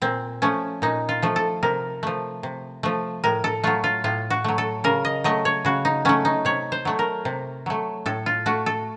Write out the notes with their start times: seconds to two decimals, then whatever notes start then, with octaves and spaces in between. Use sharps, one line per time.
0.02 A#2 C4
0.42 F3 A3 C#4
0.82 A#2 D#4
1.09 F4
1.22 F3 A3
1.36 A4
1.63 C3 A#4
2.03 F3 A3
2.43 C3
2.83 F3 A3
3.24 A2 A#4
3.44 A4
3.64 F#3 A3 F4
3.84 F4
4.04 A2 F4
4.30 F#4
4.44 F#3 A3
4.58 A4
4.84 C#3 A#4
5.05 D#5
5.24 F#3 A3 D#5
5.45 C#5
5.65 C#3 F#4
5.85 D#4
6.05 F#3 A3 C#4
6.25 D#4
6.45 C3 C#5
6.72 C5
6.85 F#3 A3
6.99 A#4
7.25 C3
7.66 F#3 A3
8.06 A2 A4
8.26 F4
8.46 A3 F#4
8.66 A4